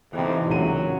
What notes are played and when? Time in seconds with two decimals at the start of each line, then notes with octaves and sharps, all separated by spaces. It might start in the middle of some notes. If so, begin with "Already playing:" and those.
0.13 F2 C3 E3 D#4
0.48 C#2 A#2 F#3 D#7